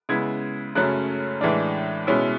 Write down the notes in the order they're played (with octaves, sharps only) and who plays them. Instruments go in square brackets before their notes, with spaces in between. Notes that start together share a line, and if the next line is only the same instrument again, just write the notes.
[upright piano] C#3 G#3 B3 E4 G#6
F#2 C#3 F#3 A3 C#4 F#6
A2 E3 G#3 D4
B2 G#3 C#4 E4